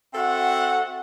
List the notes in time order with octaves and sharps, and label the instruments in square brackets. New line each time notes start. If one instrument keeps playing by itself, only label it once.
[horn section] C4 F#4 A4 E5 F#5